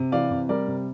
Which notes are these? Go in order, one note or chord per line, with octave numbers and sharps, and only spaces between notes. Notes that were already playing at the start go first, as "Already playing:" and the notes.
Already playing: C3
E3 D5 F5
C3
G3 A#4 D5
C3